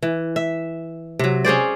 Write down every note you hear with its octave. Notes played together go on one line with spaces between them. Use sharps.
E3
E5
C3 F#3
C#4 G#4 C5 D5